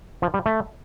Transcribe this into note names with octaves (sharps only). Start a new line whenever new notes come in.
F3
G3
A3